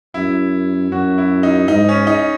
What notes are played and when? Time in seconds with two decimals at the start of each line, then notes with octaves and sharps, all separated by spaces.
0.14 F#2 E4
0.91 F#2 F#4
1.18 E4
1.43 D#4
1.68 G#2 D#4
1.89 C#4
2.07 D#4